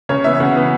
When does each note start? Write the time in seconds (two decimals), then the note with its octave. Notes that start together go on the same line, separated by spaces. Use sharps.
0.09 C#3 C#5
0.24 E3 B3 E5
0.40 C#3 F#5
0.55 E3 B3